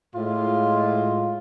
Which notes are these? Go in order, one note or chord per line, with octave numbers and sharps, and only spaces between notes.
A2 G#3 F4